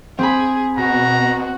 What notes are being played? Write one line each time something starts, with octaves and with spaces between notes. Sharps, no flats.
C4 G#4 B5
B2 F#4 A#5